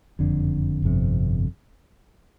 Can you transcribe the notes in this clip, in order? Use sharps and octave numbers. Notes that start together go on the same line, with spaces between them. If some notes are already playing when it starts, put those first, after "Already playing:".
F#1 F2 D3
G1 F2 C3